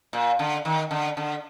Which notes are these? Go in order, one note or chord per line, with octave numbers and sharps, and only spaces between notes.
A#2
D3
D#3
D3
D3